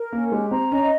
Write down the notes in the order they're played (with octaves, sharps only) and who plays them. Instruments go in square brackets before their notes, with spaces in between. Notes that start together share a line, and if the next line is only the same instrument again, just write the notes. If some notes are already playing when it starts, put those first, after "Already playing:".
Already playing: [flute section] A#4
[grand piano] A#3 [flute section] C#4
[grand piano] G#3 [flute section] G4
[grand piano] C4 [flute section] A#5
[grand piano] C#4 [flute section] D#5